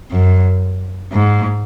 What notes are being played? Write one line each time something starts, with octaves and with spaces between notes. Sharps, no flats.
F#2
G#2